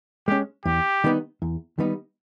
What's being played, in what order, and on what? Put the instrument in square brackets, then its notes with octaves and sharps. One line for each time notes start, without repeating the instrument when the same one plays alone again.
[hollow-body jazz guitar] G#3 C#4 [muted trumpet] G4
[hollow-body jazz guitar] E2 [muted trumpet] G4
[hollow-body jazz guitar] D#3 G3 B3 D#4
E2
D#3 G3 B3 D#4